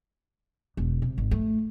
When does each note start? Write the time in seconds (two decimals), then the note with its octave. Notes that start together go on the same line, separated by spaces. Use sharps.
0.77 E1
1.02 C3
1.18 G#1
1.31 A3